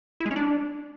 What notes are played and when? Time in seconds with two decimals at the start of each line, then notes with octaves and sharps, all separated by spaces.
0.20 E4
0.26 G#3
0.31 C#4
0.36 D4